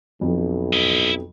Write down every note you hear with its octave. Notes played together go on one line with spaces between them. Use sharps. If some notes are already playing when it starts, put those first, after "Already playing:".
B1 F2
E4 D#5